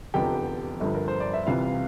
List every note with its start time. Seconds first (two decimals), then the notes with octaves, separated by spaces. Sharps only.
0.14 F1 E2 D3 F3 G4 G5
0.80 G1 G2 D3 F3
0.95 A#4
1.08 C5
1.20 D5
1.33 E5
1.46 C2 C3 E3 F4 F5